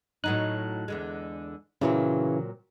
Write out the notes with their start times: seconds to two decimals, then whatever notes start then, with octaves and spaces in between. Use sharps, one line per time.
0.24 A2 F#3 D#4 F#6
0.88 E2 D3 G#3
1.81 A#2 C#3 E3 F#3 C4